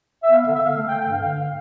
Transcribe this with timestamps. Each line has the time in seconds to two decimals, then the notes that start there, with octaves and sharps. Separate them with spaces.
0.23 E5
0.32 B3 F5
0.42 E5
0.46 D3
0.55 E5
0.62 D3 F5
0.76 A3 F5
0.89 G5
0.92 D3
1.00 G5
1.08 G2 F5
1.23 D3 F5
1.38 F5